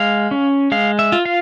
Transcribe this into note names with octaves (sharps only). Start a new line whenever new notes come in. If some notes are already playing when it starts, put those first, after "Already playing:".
Already playing: G#3 F5
C#4
G#3 F5
E5
F4
F5